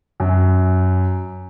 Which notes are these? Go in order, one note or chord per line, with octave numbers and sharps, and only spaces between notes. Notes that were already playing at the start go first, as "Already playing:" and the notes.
F#2